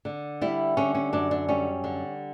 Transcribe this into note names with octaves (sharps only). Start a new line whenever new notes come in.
D3
G3 E4
D3 C#4
C#4
F#2 D4
D4
G3 C#4
D3